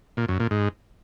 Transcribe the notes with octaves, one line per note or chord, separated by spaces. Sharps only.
A#2
F#2
A#2
G#2